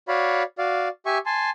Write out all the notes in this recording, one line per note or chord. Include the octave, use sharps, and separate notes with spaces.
F#4 C#5 D5 F5 B5
F#4 D5 F5
G4 E5 G#5 C#6
G#5 A5 C6